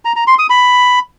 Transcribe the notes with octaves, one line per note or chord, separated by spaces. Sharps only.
A#5
A#5
C6
D#6
B5